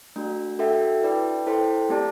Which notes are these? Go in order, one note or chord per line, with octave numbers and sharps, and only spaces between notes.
A3 D4 F#4
D4 F#4 A4 E5 G5
E4 B4 D5 G5
E4 A4 C5 G5
A3 C4 G4 D5 A5